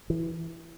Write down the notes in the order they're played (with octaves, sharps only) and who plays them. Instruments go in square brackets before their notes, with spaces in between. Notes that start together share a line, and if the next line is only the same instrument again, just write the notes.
[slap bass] E3